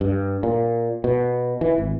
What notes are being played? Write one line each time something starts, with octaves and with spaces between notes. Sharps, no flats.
G2
A#2
B2
E3
G#1